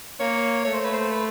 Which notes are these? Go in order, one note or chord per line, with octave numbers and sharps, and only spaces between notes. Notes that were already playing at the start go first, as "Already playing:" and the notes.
A#3 C#5
A3 C#5
C5
B4
C5
B4